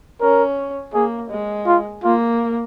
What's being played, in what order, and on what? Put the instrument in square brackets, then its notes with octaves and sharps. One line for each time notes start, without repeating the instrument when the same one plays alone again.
[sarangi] C#4 [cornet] A#4
[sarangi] A#3 [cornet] G#4
[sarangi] G#3
[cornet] F4
[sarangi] A#3 [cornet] F4